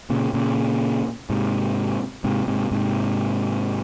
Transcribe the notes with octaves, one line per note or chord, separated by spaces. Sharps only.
A#2 C#3
A#2 C#3
G#2 C3
G#2 C3
G#2 C3
G#2 C3